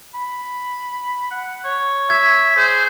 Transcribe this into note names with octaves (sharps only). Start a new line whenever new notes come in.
B5
F#5
C#5
E5 G#6
G#4 C5